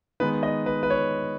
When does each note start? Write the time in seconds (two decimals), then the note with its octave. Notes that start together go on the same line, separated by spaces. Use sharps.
0.20 D#3 G#3 B3 D#4 B4
0.43 D#5
0.66 B4
0.83 B4
0.90 C#5